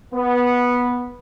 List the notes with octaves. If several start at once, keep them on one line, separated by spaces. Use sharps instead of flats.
B3